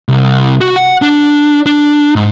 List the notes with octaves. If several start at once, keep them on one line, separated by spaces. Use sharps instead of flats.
C2
F#4
F#5
D4
D4
G#2